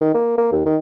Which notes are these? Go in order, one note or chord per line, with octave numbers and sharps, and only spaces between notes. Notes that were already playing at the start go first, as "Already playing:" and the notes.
D#3
A#3
A#3
D#2
D#3